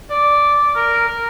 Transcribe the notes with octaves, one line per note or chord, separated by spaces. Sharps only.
D5
A#4
A#4